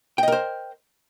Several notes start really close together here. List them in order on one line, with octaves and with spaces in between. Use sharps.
G5 D#5 A#4 C5